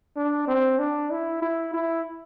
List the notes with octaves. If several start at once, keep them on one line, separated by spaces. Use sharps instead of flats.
D4
C4
D4
E4
E4
E4